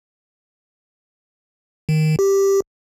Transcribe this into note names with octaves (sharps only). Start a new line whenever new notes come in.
D#3
G4